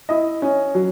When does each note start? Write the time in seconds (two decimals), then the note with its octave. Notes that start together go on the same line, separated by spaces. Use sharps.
0.09 E4 D#5
0.42 C#4
0.75 F#3